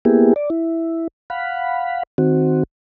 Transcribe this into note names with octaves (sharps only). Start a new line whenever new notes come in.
A#3 B3 E4 G4 G#4
D5
E4
F5 F#5 B5
D#3 C4 F#4